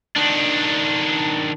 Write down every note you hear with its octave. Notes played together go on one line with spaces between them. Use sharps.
D#3 D4